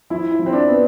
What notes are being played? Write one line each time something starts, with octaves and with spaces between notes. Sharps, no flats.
F3 E4
E4
F3
C4
D4
B3